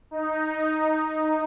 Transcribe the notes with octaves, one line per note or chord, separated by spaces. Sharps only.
D#4